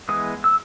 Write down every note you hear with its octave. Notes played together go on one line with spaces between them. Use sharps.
E3 G#3 B3 D#6
E6